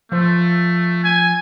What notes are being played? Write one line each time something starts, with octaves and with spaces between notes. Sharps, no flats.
F3 A3 C5
G#5